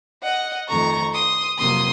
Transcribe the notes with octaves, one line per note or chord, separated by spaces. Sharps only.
D#5 F#5
F2 D#3 A3 A#5 C#6
C6 D#6
F2 C3 F#3 A#3 C6 D#6